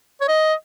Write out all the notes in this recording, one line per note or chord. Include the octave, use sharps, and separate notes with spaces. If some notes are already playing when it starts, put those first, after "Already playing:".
C#5
D#5